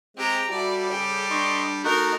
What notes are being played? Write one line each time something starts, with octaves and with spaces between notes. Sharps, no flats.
G#3 C4 G4 A#5
G3 E4 F#4 A4 D5
C#3 G4 G#4
D4 D#5 C6 C#6
A3 D#4 F#4 A#4 F6